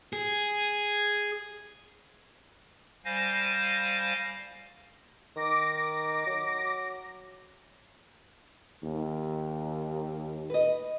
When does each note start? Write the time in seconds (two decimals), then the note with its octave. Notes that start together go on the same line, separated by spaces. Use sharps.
0.13 G#4
3.05 G3 C5 F5 G#5 A#6
5.36 D#3 D6 A#6
6.27 F#3
8.83 D#2
10.50 B4 D#5